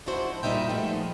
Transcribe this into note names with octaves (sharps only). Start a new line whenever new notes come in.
F3 G#3 D4 E4 F#4 C5
F#2 A#2 G3 D#4 E5 G5
F3 G#3 A3 B3